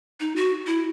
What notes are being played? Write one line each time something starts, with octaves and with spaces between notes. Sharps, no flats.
D#4
F#4
E4